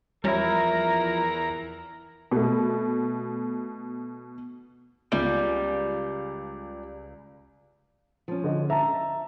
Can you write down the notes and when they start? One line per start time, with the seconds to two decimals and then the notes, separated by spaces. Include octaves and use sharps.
0.24 E2 F3 G3 C#4 E4 A#4 A#5
2.31 B2 A3
5.12 C#2 G3 F4
8.28 F3 C#4
8.44 D3 D#5
8.70 E5 A5 A#5